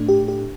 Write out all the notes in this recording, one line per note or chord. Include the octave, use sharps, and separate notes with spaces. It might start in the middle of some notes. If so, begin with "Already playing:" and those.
Already playing: A2 A3 D4
G4
G4